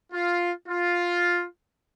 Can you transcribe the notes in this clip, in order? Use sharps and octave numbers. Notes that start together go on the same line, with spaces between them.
F4
F4